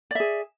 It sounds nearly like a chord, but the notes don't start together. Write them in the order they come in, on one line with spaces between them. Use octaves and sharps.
D5 E5 G#4